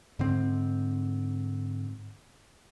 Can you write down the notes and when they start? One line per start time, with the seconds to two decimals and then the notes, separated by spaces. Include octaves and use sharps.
0.19 G#2 D3 C4